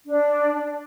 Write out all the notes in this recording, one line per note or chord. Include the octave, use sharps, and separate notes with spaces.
D4